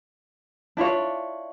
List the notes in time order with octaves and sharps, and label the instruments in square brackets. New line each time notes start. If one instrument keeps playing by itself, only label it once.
[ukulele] D4 E4 F4 C#5